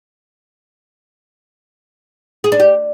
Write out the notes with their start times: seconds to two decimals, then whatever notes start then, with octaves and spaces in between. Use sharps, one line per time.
2.44 G#4
2.52 D4
2.60 G4